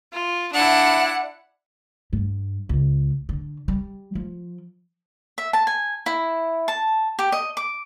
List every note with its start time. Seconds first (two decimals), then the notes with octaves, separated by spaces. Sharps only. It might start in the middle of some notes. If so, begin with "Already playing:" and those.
0.13 F4
0.53 D4 E4 F#5
2.13 G2
2.69 C#2
3.29 D3
3.68 G3
4.15 F3
5.38 E5
5.53 A5
5.67 G#5
6.06 E4
6.68 A5
7.19 G4
7.32 D#5
7.57 D6